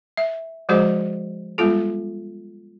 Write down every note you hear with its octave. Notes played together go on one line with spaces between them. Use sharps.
E5
F3 G#3 F#4 G#4 C5 D#5
G3 G#3 B3 F4 A4